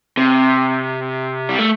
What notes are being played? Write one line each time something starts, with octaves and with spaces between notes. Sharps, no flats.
C3
G3
A3